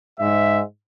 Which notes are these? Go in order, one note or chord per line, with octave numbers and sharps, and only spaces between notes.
G#2 E5